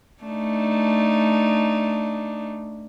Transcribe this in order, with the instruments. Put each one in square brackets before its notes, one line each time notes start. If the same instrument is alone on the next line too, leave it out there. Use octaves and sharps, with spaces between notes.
[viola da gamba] A3 D4 D#4